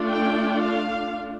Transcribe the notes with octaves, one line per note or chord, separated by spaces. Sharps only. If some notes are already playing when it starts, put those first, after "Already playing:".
Already playing: A3 D4 F4
G5
F5